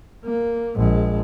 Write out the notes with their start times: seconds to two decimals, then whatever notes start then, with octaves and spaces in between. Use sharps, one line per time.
0.25 A#3
0.76 A#1 G#3